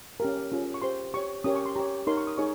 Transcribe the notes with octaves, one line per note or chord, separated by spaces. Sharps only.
C#4 G4 A#4
C#4 F4 G#4
C#6
G4 C5 C6
G4 C#5 C#6
C#4 G4 A#4 C#5 D#6
C#6
C6
G4 C#5 A#5
D#4 A#4 C#5 C6
C#6
D#6
D#4 G#4 C#5 C#6